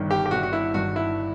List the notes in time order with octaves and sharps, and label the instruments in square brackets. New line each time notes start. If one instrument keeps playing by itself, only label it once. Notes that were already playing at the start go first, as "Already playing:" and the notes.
Already playing: [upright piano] G1 G2 D#3
[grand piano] G4
G4
[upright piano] G1 [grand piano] F#4
[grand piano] F#4
E4
[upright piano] G2 D#3 [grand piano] F#4
[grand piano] E4